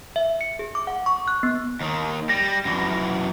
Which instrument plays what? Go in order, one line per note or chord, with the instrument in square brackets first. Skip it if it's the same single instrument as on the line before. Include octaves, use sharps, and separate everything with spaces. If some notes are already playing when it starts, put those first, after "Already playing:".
[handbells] E5
C#7
G#4
D6
F#5
C#6
F#6
B3
[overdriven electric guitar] D#2 D#3
[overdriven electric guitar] G3 [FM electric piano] A#6
[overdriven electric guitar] F#2 E3